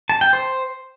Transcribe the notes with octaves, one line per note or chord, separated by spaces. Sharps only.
A5
G5
C5